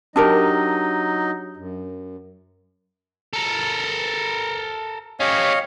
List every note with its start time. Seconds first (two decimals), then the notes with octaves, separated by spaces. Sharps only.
0.16 F#3 D4 D#4 G4 A#4 D#5
1.57 F#2
3.33 A4 A#4
5.20 C#4 G4 C#5 D#5 F5